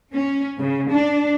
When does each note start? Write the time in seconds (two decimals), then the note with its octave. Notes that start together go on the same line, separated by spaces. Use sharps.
0.12 C#4
0.58 C#3
0.91 D4